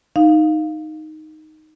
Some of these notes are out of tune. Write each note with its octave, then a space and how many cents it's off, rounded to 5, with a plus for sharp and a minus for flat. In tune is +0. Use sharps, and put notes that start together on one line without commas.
D#4 +0 F5 +0